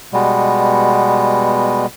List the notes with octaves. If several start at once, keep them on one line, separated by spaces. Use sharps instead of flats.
B2 G3 G#3 B3